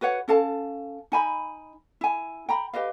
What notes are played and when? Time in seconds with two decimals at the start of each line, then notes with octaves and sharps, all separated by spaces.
0.01 F#4 B4 C#5 F#5
0.28 C#4 A4 F5 A5
1.12 D#4 G#5 B5
2.01 E4 G#5
2.49 G5 A#5 B5
2.73 G4 B4 D#5 F5